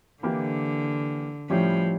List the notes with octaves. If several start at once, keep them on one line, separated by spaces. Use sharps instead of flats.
D3 E3 A#3 E4 G4
A2 F3 G3 C#4 E4 G4